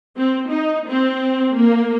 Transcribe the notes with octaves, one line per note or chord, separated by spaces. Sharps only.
C4
D#4
C4
A#3